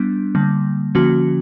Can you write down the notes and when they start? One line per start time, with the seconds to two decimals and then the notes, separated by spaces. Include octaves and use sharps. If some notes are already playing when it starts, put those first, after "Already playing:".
Already playing: G3 B3 D4
0.35 D3 G3 A#3
0.95 D3 F3 A#3 C#4 F#4